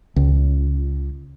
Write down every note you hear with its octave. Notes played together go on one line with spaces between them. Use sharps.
C#2